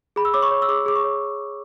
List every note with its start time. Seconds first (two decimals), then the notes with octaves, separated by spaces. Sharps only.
0.16 G#4 B5
0.25 E6
0.34 C#5 D6
0.42 C#6
0.51 C#5
0.62 E6
0.69 G#4 D6
0.86 G#4 D6
0.96 C#6
1.04 C#5